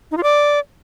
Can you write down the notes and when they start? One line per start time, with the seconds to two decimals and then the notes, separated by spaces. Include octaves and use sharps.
0.11 D#4
0.17 F4
0.23 D5